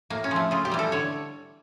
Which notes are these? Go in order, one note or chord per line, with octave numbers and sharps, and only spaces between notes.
A2 A#3
C#4
F3 A3
C#3 F4
G4
E3 G3
A4
D3 C#5